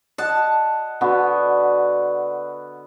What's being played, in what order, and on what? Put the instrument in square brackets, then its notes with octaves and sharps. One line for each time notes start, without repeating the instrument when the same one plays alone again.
[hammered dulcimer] D#5 F#5 [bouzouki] A5
[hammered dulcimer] D3 B3 F#4